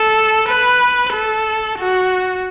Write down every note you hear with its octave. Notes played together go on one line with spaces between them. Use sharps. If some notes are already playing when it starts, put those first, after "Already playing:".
Already playing: A4
B4
A4
F#4